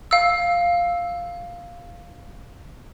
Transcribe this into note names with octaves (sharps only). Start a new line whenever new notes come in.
F5 E6